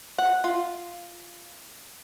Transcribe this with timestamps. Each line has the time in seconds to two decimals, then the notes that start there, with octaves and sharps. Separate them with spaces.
0.18 F#5
0.44 F4